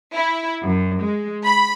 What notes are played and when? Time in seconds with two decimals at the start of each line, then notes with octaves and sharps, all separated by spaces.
0.15 E4
0.63 F#2
1.02 G#3
1.44 B5